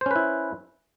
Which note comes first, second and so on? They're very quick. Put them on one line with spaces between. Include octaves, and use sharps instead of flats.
C5 C#4 B4 E4